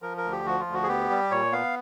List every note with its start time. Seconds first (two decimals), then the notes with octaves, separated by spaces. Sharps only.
0.02 F3 A#4
0.17 A#4
0.24 D2
0.32 G4
0.45 F3 F#4
0.60 F4
0.67 D2
0.74 F#4
0.83 G#4
0.88 B3 G4
1.10 G3
1.31 A#2 C#5
1.52 B3 F5